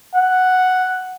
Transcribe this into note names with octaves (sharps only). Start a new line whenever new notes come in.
F#5